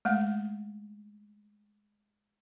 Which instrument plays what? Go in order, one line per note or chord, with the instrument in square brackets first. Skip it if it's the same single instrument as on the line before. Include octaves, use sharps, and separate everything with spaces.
[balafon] G#3 A3 F#5